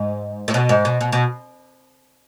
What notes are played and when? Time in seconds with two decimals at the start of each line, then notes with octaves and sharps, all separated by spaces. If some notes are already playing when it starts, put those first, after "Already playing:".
Already playing: G#2
0.48 A2
0.54 B2
0.69 G#2
0.85 B2
1.01 B2
1.12 B2